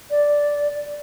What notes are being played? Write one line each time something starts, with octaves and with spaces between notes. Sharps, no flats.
D5